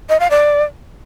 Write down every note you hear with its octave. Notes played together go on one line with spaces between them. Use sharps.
D#5
F5
D5